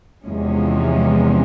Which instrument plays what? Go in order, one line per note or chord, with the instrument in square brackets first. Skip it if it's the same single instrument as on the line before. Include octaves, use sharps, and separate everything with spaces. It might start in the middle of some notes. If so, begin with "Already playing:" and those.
[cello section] E2 C3 F3 G#3 C#4